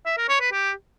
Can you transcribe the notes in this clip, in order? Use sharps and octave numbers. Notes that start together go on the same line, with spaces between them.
E5
A#4
C#5
B4
G4